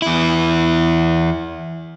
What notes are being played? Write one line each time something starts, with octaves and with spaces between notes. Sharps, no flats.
E2 E4